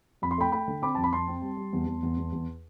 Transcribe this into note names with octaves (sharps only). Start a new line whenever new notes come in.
F2 B5
C6
A3 G5 B5
A3 G5 B5
D3
C4 B5 D6
F2 A5
B5
F2 A5 C6
C4
G3
G3
E2
E2
E2
E2
E2